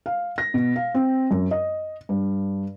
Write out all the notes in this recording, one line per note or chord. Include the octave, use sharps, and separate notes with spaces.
F5
A#6
B2
F5
C4
F#2
D#5
G2